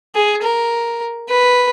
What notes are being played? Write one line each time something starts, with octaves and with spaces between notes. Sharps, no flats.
G#4
A#4
B4